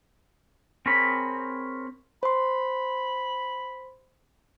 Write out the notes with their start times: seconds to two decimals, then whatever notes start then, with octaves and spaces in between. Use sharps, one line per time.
0.86 C4 G#4 A#4 C#5 B5
2.23 C5 B5 C6